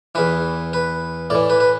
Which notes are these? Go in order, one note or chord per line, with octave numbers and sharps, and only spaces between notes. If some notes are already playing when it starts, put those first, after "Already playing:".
E2 E3 B4
B4
A2 E3 D5
B4
B4